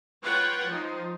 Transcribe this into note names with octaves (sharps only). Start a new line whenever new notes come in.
F4 B4 C#5 F#5 G5
F3 D#4